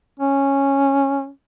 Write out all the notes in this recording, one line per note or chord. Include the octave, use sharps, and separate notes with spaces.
C#4